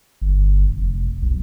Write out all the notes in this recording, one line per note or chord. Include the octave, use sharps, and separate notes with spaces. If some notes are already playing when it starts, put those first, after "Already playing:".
G1
F1
B1